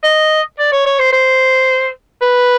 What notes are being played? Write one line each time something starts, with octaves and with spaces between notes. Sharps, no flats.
D#5
D5
C#5
C#5
C5
C5
B4